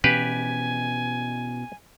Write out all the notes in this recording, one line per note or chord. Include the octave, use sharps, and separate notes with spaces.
B2 E3 C#4 G4 B4 F5 G#5